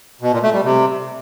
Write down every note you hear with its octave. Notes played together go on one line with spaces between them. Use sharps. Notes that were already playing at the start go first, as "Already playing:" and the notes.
B2
A#2
A3
G3
C3